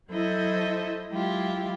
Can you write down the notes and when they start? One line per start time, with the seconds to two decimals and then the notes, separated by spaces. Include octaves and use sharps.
0.11 F#3 E4 A4 C5 D#5 E5
1.10 F#3 G#3 E4 F4 G4